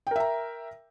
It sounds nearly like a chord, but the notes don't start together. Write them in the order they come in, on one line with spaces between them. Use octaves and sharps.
G5 A#4 E5 A#5